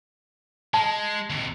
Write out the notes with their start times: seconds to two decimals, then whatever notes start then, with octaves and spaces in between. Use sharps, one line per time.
0.74 G#3 A5
1.30 D#2 C3